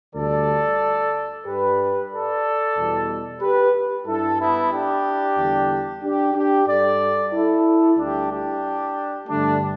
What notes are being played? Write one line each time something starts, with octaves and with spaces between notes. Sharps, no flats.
D2 D3 G3 A4 D5
G2 G3 G4 B4
A4 D5
E2 B2 G3
G4 B4
G2 G3 E4 A4
B3 E4
D4 G4
E2 D3 G3
D4 G4
D4 G4
G2 G3 A4 D5
E4 A4
D2 D3 G3 D4 G4
D4 G4
G2 D3 G3 A3 D4